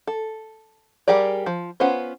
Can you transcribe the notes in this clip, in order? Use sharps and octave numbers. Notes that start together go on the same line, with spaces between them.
A4
G3 G4 G#4 A#4 D5
F3
B3 C#4 F4 C5